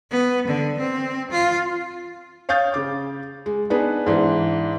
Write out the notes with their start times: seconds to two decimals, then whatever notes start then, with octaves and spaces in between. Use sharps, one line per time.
0.11 B3
0.47 D3
0.79 C4
1.31 F4
2.49 C#5 F5 D#6 G6 A6
2.74 C#3 D6
3.46 G#3
3.70 B3 D4 D#4 G#4 B4
4.06 G#2 E3 D4